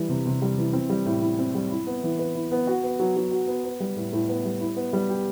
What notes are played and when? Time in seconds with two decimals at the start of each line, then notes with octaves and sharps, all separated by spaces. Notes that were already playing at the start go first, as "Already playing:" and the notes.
Already playing: E3 G3
0.09 C3
0.26 C3
0.42 G3
0.58 E3
0.73 C4
0.90 G3
1.06 A2
1.22 E4
1.39 C4
1.55 G3
1.71 E4
1.87 B3
2.03 E3
2.19 B4
2.35 E4
2.51 B3
2.67 F#4
2.83 B3
2.99 F#3
3.16 F#3
3.31 F#4
3.47 B3
3.64 B3
3.80 G3
3.96 A2
4.13 A2
4.29 B3
4.45 G3
4.61 E4
4.76 B3
4.93 G3
5.09 G4